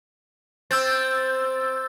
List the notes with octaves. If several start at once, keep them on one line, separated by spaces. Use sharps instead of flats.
C4 E6 G6 A6